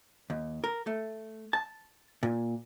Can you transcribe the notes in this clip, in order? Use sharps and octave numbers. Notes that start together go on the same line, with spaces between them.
D#2
A#4
A3
A5
A#2